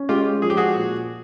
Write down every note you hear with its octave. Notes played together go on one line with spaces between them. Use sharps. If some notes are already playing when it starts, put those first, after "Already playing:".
Already playing: C#4
G#3 F4 G4
F3 G#4
G4
F#4 G#4
A#2